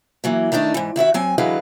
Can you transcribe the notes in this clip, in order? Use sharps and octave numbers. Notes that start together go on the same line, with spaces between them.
E3 F#3 A#3
D#3 A3 D4 D#4
G#2 E3
D#3 E4 F#4 E5
F#3 C4 G#5
D3 E3 F#3 G#3 B4 F5